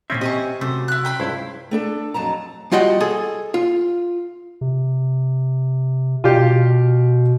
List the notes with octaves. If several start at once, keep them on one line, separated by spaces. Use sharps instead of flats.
A#2 D#3 C4 C#4 E5
C3 C5 D#5 G#5 C#6
F#2 C3 A3 C5
E4 F#6
G5 B5 C6
C#2 G2 E4 C5
A3 D4 A4
F2 F#3 A5 A#5
G3 F4 F#4 D#5 F#5 G5
G#4 A4
F4
C3
B2 F4 G4